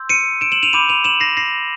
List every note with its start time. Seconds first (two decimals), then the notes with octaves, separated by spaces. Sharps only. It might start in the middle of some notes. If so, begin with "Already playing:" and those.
Already playing: C6 E6 G6
0.09 C#7 D#7
0.41 D7 E7
0.52 E7 F#7
0.63 D#7 F7
0.73 B5 D6 G6 D#7 F7
0.89 D#7 F7
1.04 E7 F#7
1.20 A#6 C7
1.37 A#6 C7